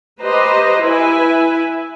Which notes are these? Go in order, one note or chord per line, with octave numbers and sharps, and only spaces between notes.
G4 B4 C5 D#5 A#5
E4 B4 E5 G#5